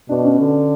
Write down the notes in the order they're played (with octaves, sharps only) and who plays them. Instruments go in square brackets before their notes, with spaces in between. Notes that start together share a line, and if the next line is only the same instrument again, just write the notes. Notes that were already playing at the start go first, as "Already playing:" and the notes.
[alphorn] B2 [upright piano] D4
[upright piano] C#4
[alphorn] D3